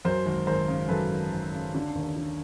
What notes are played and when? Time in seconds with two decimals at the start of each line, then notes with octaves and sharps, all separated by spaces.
0.05 F#2 A#4 C5
0.26 G#1
0.47 G#1 A#4 C5
0.68 C#3
0.89 F#2 A4 B4
1.11 G#1
1.32 G#1
1.53 C#3
1.75 D3
1.96 D#2
2.16 D3